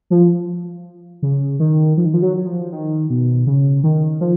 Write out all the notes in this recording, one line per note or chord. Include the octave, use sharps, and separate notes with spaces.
F3
C#3
D#3
F3
D#3
F3
F#3
F#3
F3
D#3
B2
C#3
D#3
F3